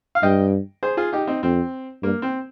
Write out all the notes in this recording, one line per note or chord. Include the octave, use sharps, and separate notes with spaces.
F5
G2 D#5 G5
G#4 C5
F4 G#4
D#4 G4
C4 D#4
F2 C4
G2 A#3
C4